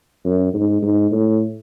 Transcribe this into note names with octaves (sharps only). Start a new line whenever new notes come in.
F#2
G#2
G#2
A2